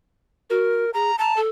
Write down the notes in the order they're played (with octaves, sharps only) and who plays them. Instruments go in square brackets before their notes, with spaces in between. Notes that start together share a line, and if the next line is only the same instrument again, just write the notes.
[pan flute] F#4 [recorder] A#4
[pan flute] G#4 [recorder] A#5
[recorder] A5 [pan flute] A#5
[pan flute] A4